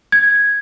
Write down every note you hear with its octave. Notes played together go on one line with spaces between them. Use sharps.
G#6